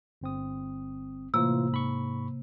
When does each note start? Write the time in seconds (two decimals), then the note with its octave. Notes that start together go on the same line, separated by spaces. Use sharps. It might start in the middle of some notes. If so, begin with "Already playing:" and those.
0.22 G1 C4 D#6
1.34 A2 C3 E3 A#3 F4 E6
1.72 G#2 B5 C#6